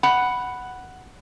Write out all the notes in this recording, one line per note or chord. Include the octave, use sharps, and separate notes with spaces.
F#5 B5